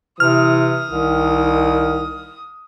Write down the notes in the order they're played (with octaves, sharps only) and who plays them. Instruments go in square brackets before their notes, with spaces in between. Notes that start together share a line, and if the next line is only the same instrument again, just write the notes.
[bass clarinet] C3 [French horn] E3 [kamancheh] D#6 [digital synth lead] F6
[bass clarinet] C2 [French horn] D#3